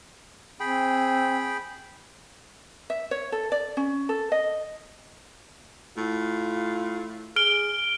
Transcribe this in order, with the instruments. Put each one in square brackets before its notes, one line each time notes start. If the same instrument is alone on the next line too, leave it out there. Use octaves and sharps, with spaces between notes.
[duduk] C4 [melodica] G#4 G5 B5
[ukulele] E5
C#5
A4
D5
C#4
A4
D#5
[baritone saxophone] A2 [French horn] F4
[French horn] G#4 [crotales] F6 D7 G7